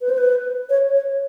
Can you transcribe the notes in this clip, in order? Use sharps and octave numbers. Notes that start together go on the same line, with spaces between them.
B4
C5
B4
C#5
C#5